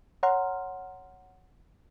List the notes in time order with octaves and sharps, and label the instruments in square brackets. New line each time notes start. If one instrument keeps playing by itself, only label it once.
[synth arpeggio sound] C#5 F#5 A#5 C6 F6